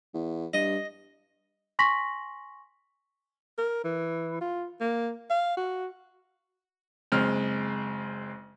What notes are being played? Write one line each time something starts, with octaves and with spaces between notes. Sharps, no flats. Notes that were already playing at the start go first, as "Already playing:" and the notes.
E2
G2 D#5
G#5 C6 C#6 A#6 B6 F#7
A#4
E3
F4
A#3
F5
F#4
F#1 G#3 C4 F6